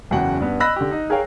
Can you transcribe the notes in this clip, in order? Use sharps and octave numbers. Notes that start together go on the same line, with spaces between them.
F#1 E2 C#3 F#4 F#5 G5
G2 B3
D#5 B5 E6 F#6 A#6
D3 G4
D#4
G#4 A#4 C#5 F5 G5